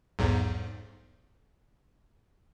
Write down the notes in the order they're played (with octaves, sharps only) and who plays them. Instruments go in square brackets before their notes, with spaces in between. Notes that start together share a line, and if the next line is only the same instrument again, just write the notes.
[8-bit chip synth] B1 E2 G#2